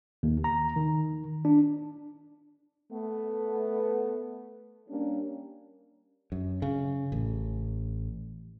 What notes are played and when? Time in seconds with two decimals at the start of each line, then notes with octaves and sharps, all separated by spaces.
0.23 D#2
0.44 A#5
0.76 D#3
1.45 D4
2.92 A3 B3
4.88 G3 A#3 C#4 D4
6.32 F#2
6.62 C#3
7.12 A1